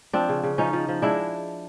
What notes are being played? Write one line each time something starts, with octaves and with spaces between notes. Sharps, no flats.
F3 C4 D4
C#3
C#3
F3 C#4 D#4
F3
F3
G#3 D4 E4